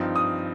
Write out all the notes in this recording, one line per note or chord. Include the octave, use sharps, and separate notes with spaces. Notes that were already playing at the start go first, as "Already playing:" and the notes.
Already playing: G2 F3 C4 D#4
D#6